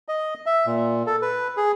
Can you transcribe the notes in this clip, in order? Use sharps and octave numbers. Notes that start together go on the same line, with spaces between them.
D#5
E5
A#2
A4
B4
G#4